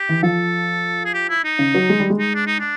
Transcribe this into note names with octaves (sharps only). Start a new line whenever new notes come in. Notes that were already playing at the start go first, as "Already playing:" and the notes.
Already playing: G4
E3
F3 A4
G#4
G4
E4
D#4
C#3
F#3
G#3
G3
G#3
D#4
D4
D#4
D4